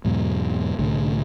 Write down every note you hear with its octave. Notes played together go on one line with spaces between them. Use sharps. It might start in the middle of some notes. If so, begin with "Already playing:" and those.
E2 G#2 B2 F#3
C2 A2 D3 A3